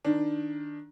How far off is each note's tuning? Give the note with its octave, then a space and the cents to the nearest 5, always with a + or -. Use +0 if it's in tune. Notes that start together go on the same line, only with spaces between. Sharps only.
D#3 +0 D4 +0